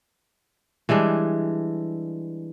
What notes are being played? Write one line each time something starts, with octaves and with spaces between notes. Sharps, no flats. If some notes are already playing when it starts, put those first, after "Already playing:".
E3 G3 G#3 D4